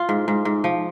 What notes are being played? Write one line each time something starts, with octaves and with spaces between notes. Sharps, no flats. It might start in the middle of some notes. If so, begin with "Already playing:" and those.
Already playing: F4
G#2
G#2
G#2
F3